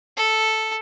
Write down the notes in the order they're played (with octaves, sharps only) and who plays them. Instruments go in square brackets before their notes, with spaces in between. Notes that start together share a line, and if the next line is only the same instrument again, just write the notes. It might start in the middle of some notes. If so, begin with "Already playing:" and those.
[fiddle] A4